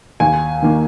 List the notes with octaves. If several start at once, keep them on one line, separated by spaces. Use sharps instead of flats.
D#2 G#5
D#3 A#3